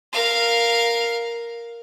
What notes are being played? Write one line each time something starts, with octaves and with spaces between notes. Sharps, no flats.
A#4 F5